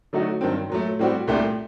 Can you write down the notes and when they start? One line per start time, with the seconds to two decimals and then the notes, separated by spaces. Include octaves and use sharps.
0.13 D3 F#3 A3 D#4 F#4
0.41 G2 D#3 F#3 C4
0.70 A#2 F#3 A3
0.99 A2 G3 C4 F#4
1.27 C2 A#2 A3 D4 G4